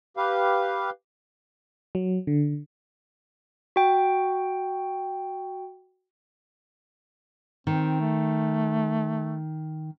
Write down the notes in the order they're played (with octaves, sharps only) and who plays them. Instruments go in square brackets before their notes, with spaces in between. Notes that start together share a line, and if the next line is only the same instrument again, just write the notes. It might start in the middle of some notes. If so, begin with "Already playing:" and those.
[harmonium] G4 B4 F5
[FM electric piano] F#3
D3
[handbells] F#4 G5
[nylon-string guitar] D#3 [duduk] C4
[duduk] A3